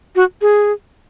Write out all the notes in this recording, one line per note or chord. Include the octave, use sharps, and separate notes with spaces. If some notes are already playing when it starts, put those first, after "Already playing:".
F#4
G#4